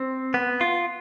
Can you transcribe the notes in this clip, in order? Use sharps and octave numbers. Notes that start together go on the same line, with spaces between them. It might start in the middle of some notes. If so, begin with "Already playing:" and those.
Already playing: C4
B3
F4